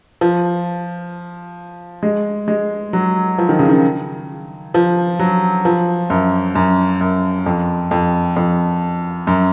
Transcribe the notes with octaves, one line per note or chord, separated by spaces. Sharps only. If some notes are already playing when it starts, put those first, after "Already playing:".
F3
G#3
G#3
F#3
F3
D#3
C#3
D#3
F3
F#3
F3
F#2
F#2
F#2
F2
F2
F2
F#2